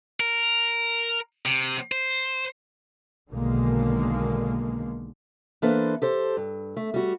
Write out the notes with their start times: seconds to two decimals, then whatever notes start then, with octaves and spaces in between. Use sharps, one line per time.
0.20 A#4
1.45 C3
1.92 C5
3.30 B1 B2 D3 D#3 G#3 A#3
5.62 E3 A#3 D4 A4 B4 C5
6.02 G4 A4 C5
6.37 G2
6.77 A3
6.94 G3 F#4